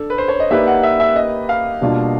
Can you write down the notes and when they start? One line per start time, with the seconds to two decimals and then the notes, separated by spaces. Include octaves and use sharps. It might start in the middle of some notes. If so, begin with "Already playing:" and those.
Already playing: D4 A4
0.10 B4
0.18 C5
0.28 C#5
0.40 D#5
0.51 A#3 D#4 G4 B4 D5 E5
0.67 F#5
0.83 E5
1.00 E5
1.16 D#5
1.49 F5
1.81 B2 G3 A#3 D4 F4